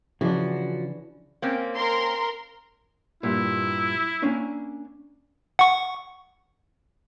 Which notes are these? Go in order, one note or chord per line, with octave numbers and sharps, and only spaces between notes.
C#3 E3 F3 D4 F#4
A#3 C4 C#4
A#4 C6
G2 A#2 E4
A#3 C#4 D4
F#5 C#6